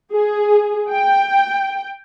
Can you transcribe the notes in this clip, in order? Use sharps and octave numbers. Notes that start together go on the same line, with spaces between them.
G#4
G5